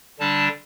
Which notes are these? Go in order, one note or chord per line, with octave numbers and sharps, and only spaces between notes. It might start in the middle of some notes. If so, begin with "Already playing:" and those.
D3 G3 D4 A5